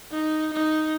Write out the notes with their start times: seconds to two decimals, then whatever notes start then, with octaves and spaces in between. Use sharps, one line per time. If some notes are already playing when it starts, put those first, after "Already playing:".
0.11 D#4
0.53 D#4